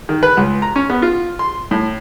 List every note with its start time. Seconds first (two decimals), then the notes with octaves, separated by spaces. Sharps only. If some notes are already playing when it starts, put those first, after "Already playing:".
0.09 D#3
0.23 B4
0.37 C#2
0.62 A#5
0.76 C#4
0.90 B3
1.02 F4
1.39 C6
1.71 A2